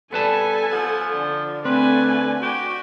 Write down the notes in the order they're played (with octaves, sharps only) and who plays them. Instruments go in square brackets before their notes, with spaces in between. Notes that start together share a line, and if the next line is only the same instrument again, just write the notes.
[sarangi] G3 [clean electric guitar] B3 B4 A5 [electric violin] A4 G#5
[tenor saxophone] F3 [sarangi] F#5
[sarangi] D3
[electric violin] A3 G#5 [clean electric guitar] C4 [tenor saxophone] B4
[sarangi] F#4 [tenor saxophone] G4